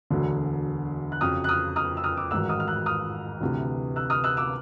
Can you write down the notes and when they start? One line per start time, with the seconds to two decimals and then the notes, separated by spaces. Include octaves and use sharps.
0.10 E1 D2 D3 F#3
1.12 F#6
1.21 F2 C#3 F#3 D#6 F6
1.44 F#6
1.49 D#6 F6
1.76 D#6 F6
1.97 E6
2.04 D#6 F6
2.17 D6 E6
2.31 A1 G#2 D#3 F#3 E6 F#6
2.49 D#6 F6
2.60 F6
2.67 E6 F#6
2.86 D#6 F6
3.41 D2 C3 E3
3.96 E6 F#6
4.10 D#6 F6
4.24 E6 F#6
4.37 D6 E6